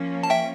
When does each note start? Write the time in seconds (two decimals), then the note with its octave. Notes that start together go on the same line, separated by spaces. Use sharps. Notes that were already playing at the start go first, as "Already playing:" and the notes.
Already playing: F3 A#3 C#4
0.23 A5
0.30 E5 G5